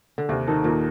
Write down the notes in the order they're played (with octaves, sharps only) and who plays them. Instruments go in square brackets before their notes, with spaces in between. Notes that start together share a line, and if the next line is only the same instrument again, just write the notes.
[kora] D3
[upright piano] D#2 [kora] C3
[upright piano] D#3 A#3 D#4 A4
[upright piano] D#2 [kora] A#2